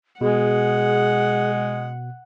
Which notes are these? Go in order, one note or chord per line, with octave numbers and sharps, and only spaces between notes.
B2 G#3 G#4 F#5